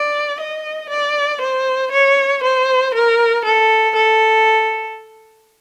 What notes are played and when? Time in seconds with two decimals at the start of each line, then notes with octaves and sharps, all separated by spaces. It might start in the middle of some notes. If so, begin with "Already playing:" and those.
Already playing: D5
0.40 D#5
0.90 D5
1.41 C5
1.92 C#5
2.43 C5
2.94 A#4
3.45 A4
3.96 A4